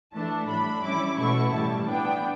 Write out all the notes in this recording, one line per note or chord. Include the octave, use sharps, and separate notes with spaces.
E3 A3 D4 A5
A2 G3 D4 B5
E3 G3 C#4 E4 D6
B2 A3 E4 C#6
A2 E3 G3 A5
E3 B3 D4 G5